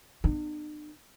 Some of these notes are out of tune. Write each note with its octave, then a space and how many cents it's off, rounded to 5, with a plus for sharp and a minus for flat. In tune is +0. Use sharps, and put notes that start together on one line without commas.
B3 +0 D4 +45